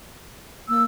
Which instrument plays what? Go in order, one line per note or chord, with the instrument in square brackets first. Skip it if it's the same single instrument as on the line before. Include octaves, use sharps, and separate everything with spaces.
[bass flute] A#3 [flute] E6